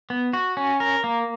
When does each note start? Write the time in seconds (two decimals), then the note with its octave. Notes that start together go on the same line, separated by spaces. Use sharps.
0.10 B3
0.33 F#4
0.57 C#4
0.80 A#4
1.04 A#3